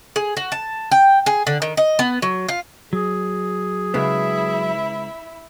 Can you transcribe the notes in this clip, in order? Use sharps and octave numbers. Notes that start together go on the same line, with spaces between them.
G#4
F#4
A5
G5
G#4
D3
D#3
D#5
B3
F#3
F4
F#3 G#4
C#3 G#3 B3 E4 E5 B5